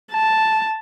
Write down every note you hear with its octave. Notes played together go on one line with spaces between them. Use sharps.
A5